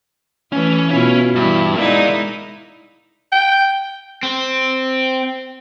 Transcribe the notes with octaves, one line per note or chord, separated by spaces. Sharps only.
E3 A3 C#4
B2 C#4 E4 F4
G2 E3 E4
G#3 D#4 E4 A#4 D5
G5
C4